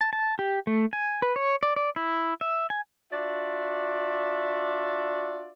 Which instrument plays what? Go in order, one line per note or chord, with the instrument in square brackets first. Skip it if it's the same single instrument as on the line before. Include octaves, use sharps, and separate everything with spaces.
[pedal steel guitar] A5
A5
G4
A3
G#5
B4
C#5
D5
D5
E4
E5
G#5
[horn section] D4 F4 F#4 D5 E5